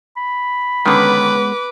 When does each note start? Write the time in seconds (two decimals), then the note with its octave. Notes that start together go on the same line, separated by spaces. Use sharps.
0.17 B5
0.86 D3 D#3 G#3 B3 C#4 B4 D6